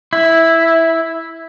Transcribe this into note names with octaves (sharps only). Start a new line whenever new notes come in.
E4